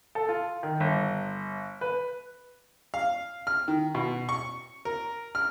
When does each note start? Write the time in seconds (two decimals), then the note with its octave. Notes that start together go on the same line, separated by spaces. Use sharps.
0.15 A4
0.29 F4
0.63 D#3
0.80 G1
1.81 B4
2.94 F5
3.47 F6
3.68 D#3
3.95 B2
4.29 C#6
4.85 A#4
5.35 F6